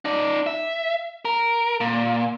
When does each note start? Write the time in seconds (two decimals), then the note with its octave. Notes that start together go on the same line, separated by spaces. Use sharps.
0.05 D#4 D5
0.47 E5
1.25 A#4
1.81 A#2